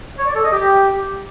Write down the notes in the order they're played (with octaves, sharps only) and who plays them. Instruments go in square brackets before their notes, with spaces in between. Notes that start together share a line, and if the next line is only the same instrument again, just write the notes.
[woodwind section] C#5
D5
A4
D#5
G4